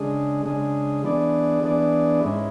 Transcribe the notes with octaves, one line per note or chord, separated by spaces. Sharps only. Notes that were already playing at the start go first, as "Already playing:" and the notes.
Already playing: C#3 G#3 D4 G#4
C#3 G#3 D4 G#4
E3 B3 D4 G#4 D5
E3 B3 D4 G#4 D5
G#2 G#3 C#4 E4